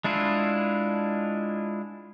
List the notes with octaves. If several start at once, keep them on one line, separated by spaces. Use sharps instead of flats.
G#3 D4 E4 F4